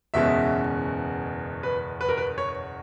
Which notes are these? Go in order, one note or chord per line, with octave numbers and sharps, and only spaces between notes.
F#1 E2 B2 G#3 C#4 E5
B4
B4
A#4
B4
C#5